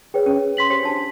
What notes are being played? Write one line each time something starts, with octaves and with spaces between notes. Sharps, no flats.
G#4 B4 C#5 G5
C#4
C6 B6 F#7
G4 C5 C#5
D4 F#4 A5